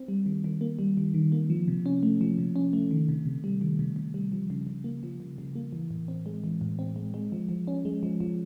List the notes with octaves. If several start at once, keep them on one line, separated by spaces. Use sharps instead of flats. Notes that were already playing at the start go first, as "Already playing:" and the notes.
Already playing: C4
G3
D#3
D#3
A#3
G3
D#3
D#3
A#3
F3
C3
C#4
A3
F3
C3
C#4
A3
D#3
C3
C3
G3
D#3
C3
C3
G3
F3
C#3
C#3
A#3
F3
C#3
C#3
A#3
E3
A2
C4
G#3
E3
A2
C4
G#3
G#3
F3
F3
C#4
G#3
F3
F3